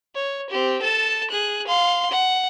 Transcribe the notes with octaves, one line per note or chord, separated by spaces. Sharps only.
C#5
C4 G4
A4 A5
G#4 F#6
F5 C6
F#5